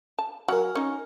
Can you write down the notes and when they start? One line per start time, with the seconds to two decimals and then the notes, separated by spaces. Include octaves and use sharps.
0.19 A5
0.48 F#3 A#4 F#5 G#5 F6
0.75 C#4 D#4